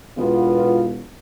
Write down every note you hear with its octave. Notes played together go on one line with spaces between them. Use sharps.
E1 B3 F4